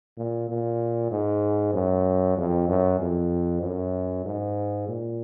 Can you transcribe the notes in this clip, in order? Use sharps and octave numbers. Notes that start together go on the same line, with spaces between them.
A#2
A#2
G#2
F#2
F2
F#2
F2
F#2
G#2
A#2